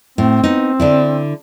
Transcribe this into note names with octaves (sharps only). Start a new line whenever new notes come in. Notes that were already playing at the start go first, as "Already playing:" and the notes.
A2 C4
B3 D#4
D3 D4 E4